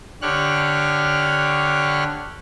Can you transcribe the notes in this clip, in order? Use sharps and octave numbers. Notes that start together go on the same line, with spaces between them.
D3 G4 C#5 F6 F#6